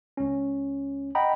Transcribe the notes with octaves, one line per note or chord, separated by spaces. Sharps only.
C#2 C#4
D#5 F#5 G5 A#5 B5